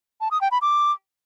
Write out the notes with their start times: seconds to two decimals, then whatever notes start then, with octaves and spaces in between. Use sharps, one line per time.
0.21 A5
0.31 D#6
0.41 G5
0.51 B5
0.62 D6